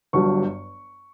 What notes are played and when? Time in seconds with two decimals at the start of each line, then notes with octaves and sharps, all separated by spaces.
0.13 G1 G2 F#3 C#6